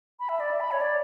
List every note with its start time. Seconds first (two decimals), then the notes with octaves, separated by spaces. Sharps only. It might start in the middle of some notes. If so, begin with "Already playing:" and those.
0.20 B5
0.29 E5
0.40 D5
0.51 E5
0.60 B5
0.71 C#5
0.81 D5